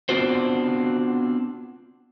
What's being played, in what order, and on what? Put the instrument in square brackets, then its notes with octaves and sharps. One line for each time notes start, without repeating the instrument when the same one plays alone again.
[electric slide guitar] B3 C4 D4 F4 F#4 C5